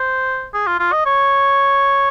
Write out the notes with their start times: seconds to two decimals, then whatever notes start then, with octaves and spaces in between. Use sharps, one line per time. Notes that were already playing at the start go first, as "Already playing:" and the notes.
Already playing: C5
0.54 G#4
0.67 F4
0.79 F4
0.93 D#5
1.06 C#5